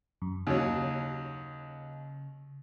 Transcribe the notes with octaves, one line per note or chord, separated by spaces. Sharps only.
F#2
D#2 C#3 F#3